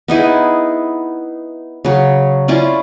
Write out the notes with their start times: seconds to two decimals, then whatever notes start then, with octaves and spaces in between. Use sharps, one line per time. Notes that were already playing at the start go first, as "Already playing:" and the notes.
0.08 B3 D#4 E4 G#4
1.84 C#3 F#3
2.48 C#4 E4 F4 D5